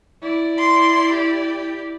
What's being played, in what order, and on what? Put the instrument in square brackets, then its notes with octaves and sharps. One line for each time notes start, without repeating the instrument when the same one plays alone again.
[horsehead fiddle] E4 D5
[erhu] C6
G4